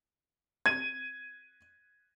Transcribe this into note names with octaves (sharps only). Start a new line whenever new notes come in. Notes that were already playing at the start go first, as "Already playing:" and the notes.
G#6 D#7